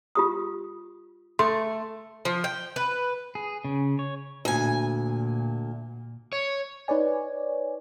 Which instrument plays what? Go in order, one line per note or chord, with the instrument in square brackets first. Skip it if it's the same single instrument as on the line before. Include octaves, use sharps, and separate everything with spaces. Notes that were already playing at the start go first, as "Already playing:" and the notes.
[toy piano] F4 G4 D#6
[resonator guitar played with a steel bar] A3 [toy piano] A4 [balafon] C6
[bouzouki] F3
G5
B4
[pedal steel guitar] G#4
C#3
C#5
[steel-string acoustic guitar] D2 G#5 [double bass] A#2
[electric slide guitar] C#5
[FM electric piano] D#4 B4 C#5 D5 G#5